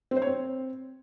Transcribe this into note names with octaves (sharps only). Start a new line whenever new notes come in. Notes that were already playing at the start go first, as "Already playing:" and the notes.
C4
C5
C#5
C4